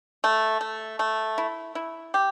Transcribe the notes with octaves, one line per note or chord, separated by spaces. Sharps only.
A3
A3
A3
E4
E4
G4